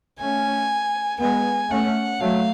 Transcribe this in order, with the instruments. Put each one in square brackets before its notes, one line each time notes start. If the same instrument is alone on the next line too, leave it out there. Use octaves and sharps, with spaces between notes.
[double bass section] A3 C#4 [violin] G#5
[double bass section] G#3 B3 [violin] G#5
[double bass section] A3 C#4 [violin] F#5
[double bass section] F#3 A3 [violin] F5